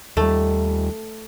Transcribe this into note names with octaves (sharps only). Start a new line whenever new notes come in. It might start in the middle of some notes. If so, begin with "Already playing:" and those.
D#2 G3 A3